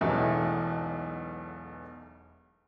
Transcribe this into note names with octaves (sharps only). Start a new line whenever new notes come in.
E1 B1 E2 B2 E3 A3